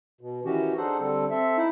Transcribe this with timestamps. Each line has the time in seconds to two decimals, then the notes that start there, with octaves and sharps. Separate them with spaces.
0.21 B2
0.45 D#3 E3 C#4 F#4 G4
0.77 D4 D#4 G#4 A4 C5 F#5
1.00 D3 G3 C4 A4
1.30 C4 A4 E5
1.57 D#4 E4